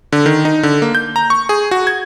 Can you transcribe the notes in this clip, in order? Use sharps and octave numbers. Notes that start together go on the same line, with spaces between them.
D3
D#3
D#4
D3
A#3
G6
A#5
C#6
G#4
F#4
G#6